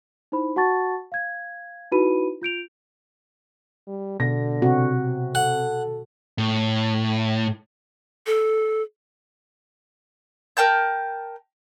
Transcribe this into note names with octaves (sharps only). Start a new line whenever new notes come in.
D#4 E4 C5 B5
F#4 F#5 A5 C#6 A6
F5 G#6
D#4 E4 F#4 B4 B5 D#7
F4 G6 D7 F7
G3
B2 D3 A#6
C3 F#4
A4 F#5
A2
A4
A#4 G5 A5 G6